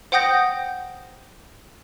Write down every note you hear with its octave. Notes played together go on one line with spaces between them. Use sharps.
C5 F#5 G5 D#6 G6 A#6